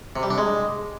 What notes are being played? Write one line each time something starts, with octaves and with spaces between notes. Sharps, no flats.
C3
G3
D4
G#3